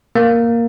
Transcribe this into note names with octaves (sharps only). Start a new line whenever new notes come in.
A#3